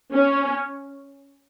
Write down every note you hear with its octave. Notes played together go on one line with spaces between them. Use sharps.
C#4